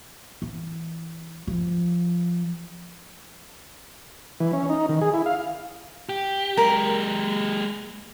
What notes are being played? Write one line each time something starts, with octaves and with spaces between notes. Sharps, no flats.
E3
F3
E3
C#4
D#4
D#3
G#4
E4
F5
G4
G#3 G4 A#4